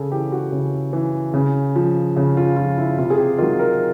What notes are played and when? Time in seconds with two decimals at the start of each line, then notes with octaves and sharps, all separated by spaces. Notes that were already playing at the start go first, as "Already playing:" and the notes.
Already playing: C#3 G#4 A4
0.12 E3 G4
0.32 F#4
0.52 C#3
0.93 E3
1.34 C#3
1.76 F3
2.16 C#3
2.37 F4
2.56 F3 F4
2.77 E4
2.98 C3 F4
3.10 G#4
3.18 G4
3.38 D#3 F#3 F4
3.59 A#4